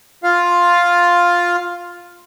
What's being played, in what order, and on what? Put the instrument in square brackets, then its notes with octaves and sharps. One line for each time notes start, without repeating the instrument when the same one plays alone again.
[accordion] F4 F5